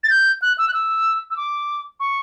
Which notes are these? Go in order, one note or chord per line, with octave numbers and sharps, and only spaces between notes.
A6
G6
F#6
E6
F#6
E6
E6
D6
C#6